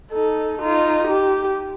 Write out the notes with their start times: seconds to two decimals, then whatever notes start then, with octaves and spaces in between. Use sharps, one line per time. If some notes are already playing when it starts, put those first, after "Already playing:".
0.11 D#4 A4
0.58 D#4 F4
1.08 G4